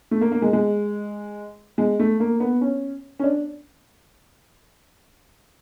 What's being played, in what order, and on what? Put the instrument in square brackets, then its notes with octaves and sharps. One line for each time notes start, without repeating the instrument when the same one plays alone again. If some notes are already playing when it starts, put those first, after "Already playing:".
[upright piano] A3
A#3
A#3
G#3
G#3
G#3
A3
A#3
B3
C#4
C#4
D4